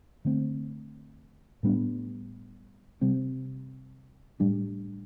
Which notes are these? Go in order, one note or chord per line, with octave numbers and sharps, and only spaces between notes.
D3 A3 C4
A2 G3 B3 D4
C3 G3 C4
A2 G3 D4